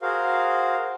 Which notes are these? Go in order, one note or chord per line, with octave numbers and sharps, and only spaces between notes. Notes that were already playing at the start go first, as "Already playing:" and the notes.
F#4 G#4 A#4 C5 F5